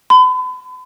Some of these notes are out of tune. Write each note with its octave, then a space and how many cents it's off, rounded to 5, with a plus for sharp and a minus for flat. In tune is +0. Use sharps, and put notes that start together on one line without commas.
B5 +40